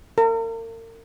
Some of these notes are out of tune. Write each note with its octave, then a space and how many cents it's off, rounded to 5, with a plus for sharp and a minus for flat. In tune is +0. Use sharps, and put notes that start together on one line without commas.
A#4 -40